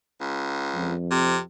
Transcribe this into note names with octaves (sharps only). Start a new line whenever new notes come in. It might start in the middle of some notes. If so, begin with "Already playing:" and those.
C#2
F2
C3